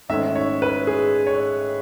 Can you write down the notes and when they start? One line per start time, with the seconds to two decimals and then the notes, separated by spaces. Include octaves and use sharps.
0.09 G#1 G#2 D#3 A3 C#4 E5
0.35 C#5
0.62 B4
0.87 G#4
1.27 C#5